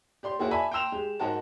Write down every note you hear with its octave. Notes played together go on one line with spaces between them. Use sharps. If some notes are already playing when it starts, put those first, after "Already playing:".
G4 D5 C6
A#3 E4 F#4 G#4 A#4
D5 E5 G#5 A5 B5
G5 A#5 C6 E6 E7 F7
G#3 G4
G#2 D#4 F#4 A#4 A5